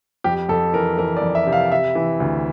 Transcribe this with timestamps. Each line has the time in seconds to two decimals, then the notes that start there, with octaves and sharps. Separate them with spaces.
0.24 F2 G4
0.49 F2 A4
0.73 E3 A#4
0.98 E3 A#4
1.17 D5
1.22 F2
1.35 E5
1.46 C3
1.53 F5
1.72 C3 E5
1.95 E3
2.20 D2